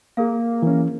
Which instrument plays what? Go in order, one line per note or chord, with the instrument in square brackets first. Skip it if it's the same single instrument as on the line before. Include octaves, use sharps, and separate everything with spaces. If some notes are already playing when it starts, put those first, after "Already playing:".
[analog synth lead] A#3 [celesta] G#4 A#4 F5
[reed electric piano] E3 C#4